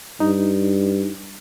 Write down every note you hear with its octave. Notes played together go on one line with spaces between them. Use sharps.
G2 D#4